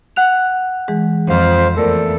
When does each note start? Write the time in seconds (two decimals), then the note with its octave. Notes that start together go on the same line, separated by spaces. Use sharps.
0.16 F#5 F#6 F7
0.88 E3 G#3 G#4
1.29 F2 C5 F5
1.76 E2 A3 A4 A#4 D5